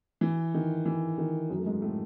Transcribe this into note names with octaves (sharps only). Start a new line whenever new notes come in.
E3
D#3
E3
D#3
F#2 F#3
A3
G#2 G#3
A2 A3